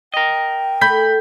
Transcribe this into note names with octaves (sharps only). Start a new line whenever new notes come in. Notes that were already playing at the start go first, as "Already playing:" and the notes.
A#4 D#5 G5
A3 B5 G6 B6